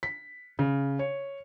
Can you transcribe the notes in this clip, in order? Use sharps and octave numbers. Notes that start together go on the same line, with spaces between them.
B6
C#3
C#5